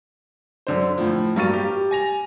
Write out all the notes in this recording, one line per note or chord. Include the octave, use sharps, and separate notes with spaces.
F#2 D3 C5
A2 F3
G2 F#3 A#3 C#6 A6 D#7
G4
G#5 A#6 F7